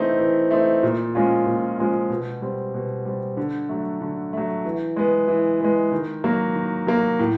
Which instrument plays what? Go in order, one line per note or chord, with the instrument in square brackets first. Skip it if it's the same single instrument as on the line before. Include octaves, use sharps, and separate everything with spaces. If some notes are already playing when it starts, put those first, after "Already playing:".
Already playing: [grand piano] E3 A3 C4 D#4
E3
A3 C4 D#4
A#2
F3 G#3 C#4 F4
A#2
F3 G#3 C#4 F4
B2
G3 C4
B2
G3 C4
D3
F#3 A3
D3
F#3 A3
E3
G#3 B3
E3
G#3 B3
D#3
F#3 A#3
D#3
F#3 A#3
A2